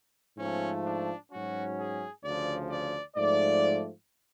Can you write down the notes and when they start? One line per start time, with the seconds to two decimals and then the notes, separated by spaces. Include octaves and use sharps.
0.38 G#2 F3 A3 C#4
0.85 D4
1.31 G#2 F#3 C#4 F#4
1.78 G#4
2.24 D2 C#3 F3 D5
2.71 D5
3.17 G#2 F3 A3 D5